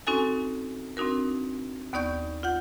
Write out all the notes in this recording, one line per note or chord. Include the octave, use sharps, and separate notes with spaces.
C4 C#4 D#4 F#4 A4 G#5
C4 D4 D#4 F#4 A#4
D#2 B3 D#4 D5 C#6 G6
F4 F#5 G6